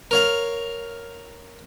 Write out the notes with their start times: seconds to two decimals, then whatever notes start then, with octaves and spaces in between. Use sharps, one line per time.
0.11 A#4 C#5 F5